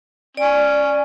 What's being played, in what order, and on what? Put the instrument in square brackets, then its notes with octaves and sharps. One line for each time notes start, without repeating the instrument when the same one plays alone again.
[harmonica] C#4 [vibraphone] D5